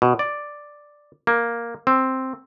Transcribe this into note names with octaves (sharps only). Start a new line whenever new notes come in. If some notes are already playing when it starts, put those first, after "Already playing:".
B2
D5
A#3
C4